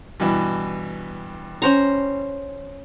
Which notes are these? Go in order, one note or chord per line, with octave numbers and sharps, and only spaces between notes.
G2 B2 E3
C#4 C5 A#5